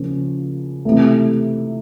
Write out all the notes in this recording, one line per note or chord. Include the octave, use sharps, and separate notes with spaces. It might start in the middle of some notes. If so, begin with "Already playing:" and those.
Already playing: C#3 F3 A#3 C#4
C3 E3 A3